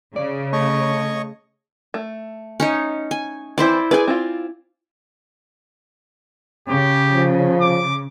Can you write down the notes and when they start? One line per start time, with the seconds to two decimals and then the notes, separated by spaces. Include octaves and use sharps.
0.16 C#3 D5
0.53 A3 C#5 D#5 C#6
1.94 A3
2.60 C#4 D#4 C#5
3.11 G#5
3.58 E3 C4 E4 C5 D5
3.91 G#4 B4 D5 G#5
4.07 C4 F4
6.68 C#3 G4
7.10 F3
7.61 D6